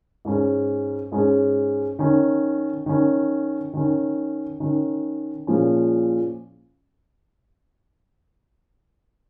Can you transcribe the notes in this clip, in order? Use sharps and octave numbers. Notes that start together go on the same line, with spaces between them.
G#2 G#3 C#4
G#2 G#3 C#4
D#3 C#4
D#3 C#4
D#3 C#4
D#3 C#4
A#2 F3 G#3 C#4